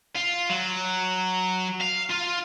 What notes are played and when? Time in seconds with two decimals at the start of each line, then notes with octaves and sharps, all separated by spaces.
0.15 F4
0.50 F#3
1.81 F5
2.10 F4